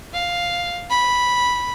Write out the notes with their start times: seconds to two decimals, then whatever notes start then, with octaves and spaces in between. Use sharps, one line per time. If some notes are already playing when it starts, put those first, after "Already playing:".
0.13 F5
0.90 B5